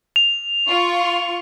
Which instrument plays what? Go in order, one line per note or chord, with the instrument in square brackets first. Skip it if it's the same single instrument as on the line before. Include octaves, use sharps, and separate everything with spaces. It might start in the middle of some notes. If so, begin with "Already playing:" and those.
[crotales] F7
[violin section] F4 C#6